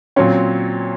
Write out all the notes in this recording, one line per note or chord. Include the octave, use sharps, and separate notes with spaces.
A#2 F#3 C4 C#4